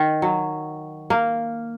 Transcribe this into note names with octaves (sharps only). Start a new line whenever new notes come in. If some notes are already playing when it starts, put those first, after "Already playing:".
Already playing: D#3
F#3
A#3